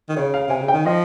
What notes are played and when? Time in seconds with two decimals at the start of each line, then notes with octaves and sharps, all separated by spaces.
0.09 D#3
0.17 C#3 C#5
0.34 F5
0.48 C3 G#5
0.62 C#3
0.68 G5
0.73 D#3
0.85 F3 D#5